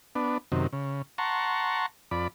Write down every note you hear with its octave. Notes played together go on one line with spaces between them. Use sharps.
B3 D4
F#2 C3 D#3
C#3
F#5 A5 A#5 C6 C#6
F2 D5 B5